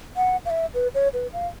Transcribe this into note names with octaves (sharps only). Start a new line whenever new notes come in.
F#5
F5
E5
B4
C#5
B4
F5